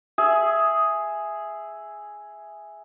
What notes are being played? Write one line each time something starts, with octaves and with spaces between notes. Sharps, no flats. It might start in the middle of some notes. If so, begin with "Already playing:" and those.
G#4 E5